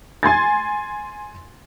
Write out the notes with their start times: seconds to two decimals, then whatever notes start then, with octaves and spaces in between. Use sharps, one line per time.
0.23 G#5 C6 G#6 A6